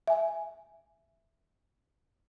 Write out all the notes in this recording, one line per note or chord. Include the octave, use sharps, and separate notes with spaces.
E5 G#5